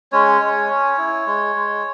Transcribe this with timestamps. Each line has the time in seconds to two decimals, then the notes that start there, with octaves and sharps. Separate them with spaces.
0.12 G#3 C#4 C#5
0.41 G#3
0.69 C#4
0.98 E4
1.26 G#3
1.56 G#3